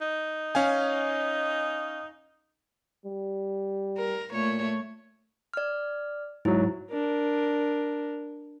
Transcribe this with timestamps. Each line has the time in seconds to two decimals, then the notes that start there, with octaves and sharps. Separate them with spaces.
0.01 D#4
0.55 C#4 F5 G#5
3.06 G3
3.98 A#4
4.32 A#2 A3 C#5
5.54 D5 F6
6.45 G#2 F#3 E4
6.90 D4 A#4